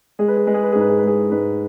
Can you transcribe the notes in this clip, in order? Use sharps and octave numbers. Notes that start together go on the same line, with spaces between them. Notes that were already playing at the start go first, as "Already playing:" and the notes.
G#3 G#4
B4
G#4
G#3 B4
G#4
B4
G#2 G#4
B4
G#4
B4
G#3 G#4
G#2 B4